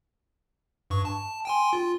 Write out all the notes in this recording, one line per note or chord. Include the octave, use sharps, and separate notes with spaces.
G2 C#6
A5
G5 G#5 C6
F4